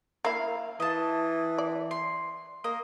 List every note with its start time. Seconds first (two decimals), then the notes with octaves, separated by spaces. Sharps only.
0.25 A#3 E4 F5
0.80 E3 D#5 A5
1.58 D5
1.91 C6
2.64 A#3 D#5